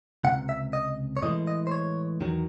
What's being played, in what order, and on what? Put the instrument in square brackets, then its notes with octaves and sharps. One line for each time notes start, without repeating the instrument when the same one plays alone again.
[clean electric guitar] C#2 C3 F#5
E5
D#5
C#5
A2 E3 G#3 D#5
D#5
C5
C#5
E2 D#3 F#3